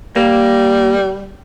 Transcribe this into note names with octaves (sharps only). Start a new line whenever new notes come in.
G3 A#3